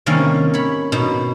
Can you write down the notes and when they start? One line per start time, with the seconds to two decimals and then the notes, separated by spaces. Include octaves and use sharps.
0.06 C3 D#3 G3 A#3 C#4
0.54 C#5 B5
0.92 B2 D#4